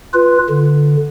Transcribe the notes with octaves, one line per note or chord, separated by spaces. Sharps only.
F4 B4
D3